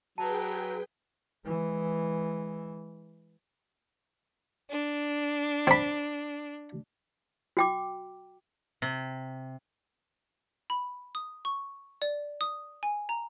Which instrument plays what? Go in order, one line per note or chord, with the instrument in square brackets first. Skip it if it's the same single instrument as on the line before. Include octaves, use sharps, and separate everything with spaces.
[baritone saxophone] F#3 [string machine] G#4 B4 G5 [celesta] A5
[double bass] E3 G#3
[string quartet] D4
[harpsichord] C4 B5
[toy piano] F#4 G5 D6
[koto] C3
[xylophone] B5
D#6
C#6
D5
D#6
G#5
A#5